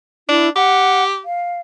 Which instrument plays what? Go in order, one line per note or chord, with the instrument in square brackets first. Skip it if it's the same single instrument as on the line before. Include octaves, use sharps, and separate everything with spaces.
[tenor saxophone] D4 [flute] E4
[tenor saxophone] G4 [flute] F#5
[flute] F5